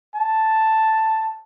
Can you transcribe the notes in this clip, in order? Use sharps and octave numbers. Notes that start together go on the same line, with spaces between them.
A5